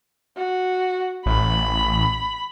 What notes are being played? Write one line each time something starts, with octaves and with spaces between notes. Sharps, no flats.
F#4
A1 B5